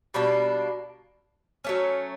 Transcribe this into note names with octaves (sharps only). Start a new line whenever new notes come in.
B2 G3 A#3 D4
F#3 A3 C#4